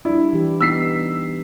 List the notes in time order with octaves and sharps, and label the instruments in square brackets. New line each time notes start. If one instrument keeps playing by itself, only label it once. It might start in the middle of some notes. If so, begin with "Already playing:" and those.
[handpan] G3 D4 [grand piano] E4
[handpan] E3 G4
[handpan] B3 D#4 [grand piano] E6 B6 C7